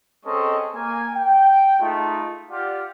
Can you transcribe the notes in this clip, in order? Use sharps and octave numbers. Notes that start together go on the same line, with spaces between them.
G#3 C4 C#4 A4 D#5 C#6
A#3 G#5
G5
G#3 A3 D#4 F4
F4 G4 D5 F#5